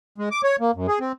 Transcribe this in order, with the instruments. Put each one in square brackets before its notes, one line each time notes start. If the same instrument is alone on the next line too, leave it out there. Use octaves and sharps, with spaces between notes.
[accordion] G#3
D6
C#5
A#3
F#2
G#4
C4